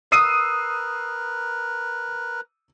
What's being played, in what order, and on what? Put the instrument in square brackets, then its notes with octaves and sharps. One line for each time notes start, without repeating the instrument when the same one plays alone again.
[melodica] A#4 B4 [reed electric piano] D#6 [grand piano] E6 C7 D#7